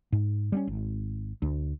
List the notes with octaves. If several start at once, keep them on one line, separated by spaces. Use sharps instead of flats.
G#2
G3 A#3 C#4
G#1
D2